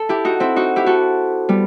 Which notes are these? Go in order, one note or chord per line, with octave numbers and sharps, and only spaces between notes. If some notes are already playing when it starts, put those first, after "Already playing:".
Already playing: A4
E4 G4
D#4 F#4
C4 E4
D#4 F#4
E4 G4
F#4 A4
G3 B3